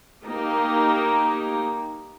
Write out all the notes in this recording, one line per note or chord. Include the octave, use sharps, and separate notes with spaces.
A#3 D#4 G4